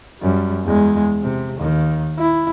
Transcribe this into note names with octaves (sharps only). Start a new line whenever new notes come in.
F#2 G3
E2 G#3
C3
D#2 D#3
E4